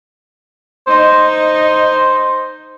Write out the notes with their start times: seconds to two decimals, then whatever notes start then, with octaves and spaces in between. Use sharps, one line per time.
0.88 D#4 C5